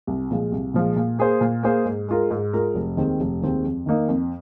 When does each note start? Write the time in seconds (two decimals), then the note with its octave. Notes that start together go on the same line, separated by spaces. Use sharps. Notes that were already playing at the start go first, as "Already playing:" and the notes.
0.07 C2
0.31 A#2 F3 G#3
0.52 C2
0.74 A#2 F3 G#3
0.96 A#2
1.19 A#3 G#4 C5
1.41 A#2
1.63 A#3 G#4 C5
1.85 G#2
2.08 G#3 F4 A#4
2.31 G#2
2.53 G#3 F4 A#4
2.75 F1
2.97 D#2 D#3 G#3 C4
3.20 F1
3.42 D#2 D#3 G#3 C4
3.64 F2
3.86 D#3 A#3 D#4
4.08 F2